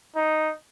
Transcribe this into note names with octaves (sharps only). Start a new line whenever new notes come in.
D#4